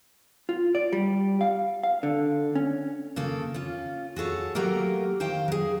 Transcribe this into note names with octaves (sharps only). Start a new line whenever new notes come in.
F4
D5
G3
F5
F5
D3
C#4
C#3 A#3 A4
C#4 F4
F#4 G#4 A4 C#5
F#3 A3 A#3 G4 A#4
D#3 C5 F5 G5
F#3 G#4